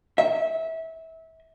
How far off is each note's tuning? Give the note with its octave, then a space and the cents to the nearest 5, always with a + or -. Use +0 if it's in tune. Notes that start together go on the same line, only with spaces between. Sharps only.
E5 -25